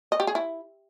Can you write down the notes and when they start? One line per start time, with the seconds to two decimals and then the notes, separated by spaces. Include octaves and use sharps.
0.12 D#5
0.20 G4
0.27 G#4
0.35 E4